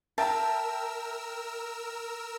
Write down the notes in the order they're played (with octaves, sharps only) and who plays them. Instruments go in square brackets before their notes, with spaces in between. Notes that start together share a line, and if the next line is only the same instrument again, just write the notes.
[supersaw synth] A#4 E6 [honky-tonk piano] E5 G5 A#5 [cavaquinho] A5